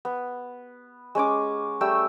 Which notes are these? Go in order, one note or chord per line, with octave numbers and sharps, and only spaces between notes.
B3
G#3 C#4 G#5 D6
G3 A3 G5 E6